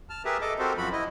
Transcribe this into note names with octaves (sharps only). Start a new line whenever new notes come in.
A5 F6
G4 G#4 A#4 B4 E5
A4 D#5 D6
C4 F#4 G4 A4 A#4 C5
F#2 F3 F#4 B5
E4 D#5